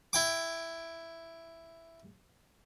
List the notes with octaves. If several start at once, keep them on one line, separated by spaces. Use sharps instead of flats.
E4 G5 D6